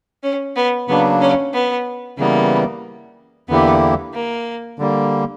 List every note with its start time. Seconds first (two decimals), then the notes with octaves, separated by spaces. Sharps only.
0.24 C#4
0.56 B3
0.88 C#3 F#3 A#3 B3 D4
1.21 C#4
1.54 B3
2.18 C#3 E3 G3 A#3 B3
3.49 E2 D3 A#3 B3 E4 G4
4.14 A#3
4.79 D3 G3 A#3